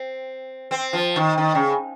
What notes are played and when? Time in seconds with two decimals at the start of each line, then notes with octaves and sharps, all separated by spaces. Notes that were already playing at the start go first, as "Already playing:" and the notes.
Already playing: C4
0.71 C4
0.93 F3
1.16 D#3
1.38 D#3
1.55 C#3